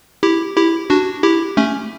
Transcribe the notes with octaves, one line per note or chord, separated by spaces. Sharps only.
E4 G4
E4 G4
D4 F#4
E4 G4
A3 C#4